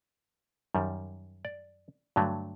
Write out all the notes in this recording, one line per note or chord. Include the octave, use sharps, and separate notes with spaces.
F#2 D#3 G3
D5
G2 D3 F#3 A3